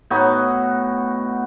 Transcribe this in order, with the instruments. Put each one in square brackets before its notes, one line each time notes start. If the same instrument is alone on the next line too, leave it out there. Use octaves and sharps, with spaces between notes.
[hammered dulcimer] A2 B3 D#4 F#4